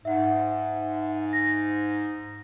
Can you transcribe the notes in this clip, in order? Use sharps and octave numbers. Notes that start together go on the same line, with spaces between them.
G#2 E5 F#5
A#6